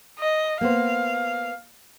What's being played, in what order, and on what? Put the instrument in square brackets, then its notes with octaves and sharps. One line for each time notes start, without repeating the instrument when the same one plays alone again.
[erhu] D#5
[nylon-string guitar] A#3 B3 C5 [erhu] F5